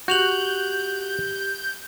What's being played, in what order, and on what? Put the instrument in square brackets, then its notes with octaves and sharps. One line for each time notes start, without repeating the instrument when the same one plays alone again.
[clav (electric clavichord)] F#4 [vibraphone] G4 [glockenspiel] F#6 F7 F#7 [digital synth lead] G6